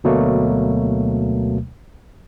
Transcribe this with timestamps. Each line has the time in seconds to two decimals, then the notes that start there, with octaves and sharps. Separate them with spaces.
0.04 D2 B2 F#3 A3 A#3